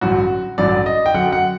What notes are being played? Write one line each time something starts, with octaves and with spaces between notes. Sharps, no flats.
A1 G2 D3 F#3 F#4
A1 G2 D3 F#3 D5
D#5
G5
F#2 D3 F#3 F#5
F#5